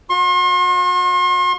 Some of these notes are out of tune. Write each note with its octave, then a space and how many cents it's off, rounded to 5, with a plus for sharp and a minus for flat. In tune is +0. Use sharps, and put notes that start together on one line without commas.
F#4 -40 C6 +45